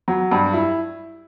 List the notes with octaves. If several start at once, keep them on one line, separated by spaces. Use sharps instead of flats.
F#3
G2
E4